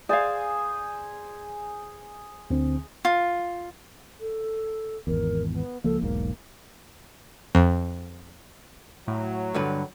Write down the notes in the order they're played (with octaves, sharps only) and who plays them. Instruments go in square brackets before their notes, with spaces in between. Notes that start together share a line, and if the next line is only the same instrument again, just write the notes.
[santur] G#4 C5 G#5 [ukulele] D5 F5
[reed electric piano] D2 D3 C4
[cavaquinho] F4
[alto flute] A4
[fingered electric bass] G#1 E2 [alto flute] A#4
[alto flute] B3
[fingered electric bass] C#2 F3 A#3 [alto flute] A4
[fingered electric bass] E1 B1 G#2 [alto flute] A#3
[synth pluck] F2
[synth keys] A2 [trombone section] F#3
[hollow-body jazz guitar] G2 D3 B4